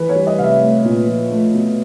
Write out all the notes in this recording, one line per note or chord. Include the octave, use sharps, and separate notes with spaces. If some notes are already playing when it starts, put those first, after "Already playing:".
Already playing: E3 B4
C#5
G3
D#5
C3 F5
E5
A3
A#2
F3
A3
B2